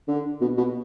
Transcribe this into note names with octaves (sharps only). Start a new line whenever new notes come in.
D3
B2
B2